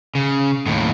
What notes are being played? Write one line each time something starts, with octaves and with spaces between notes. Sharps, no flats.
C#3
D#2 A2